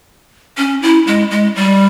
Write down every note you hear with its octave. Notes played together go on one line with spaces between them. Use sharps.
C#4
E4
G#3
G#3
G3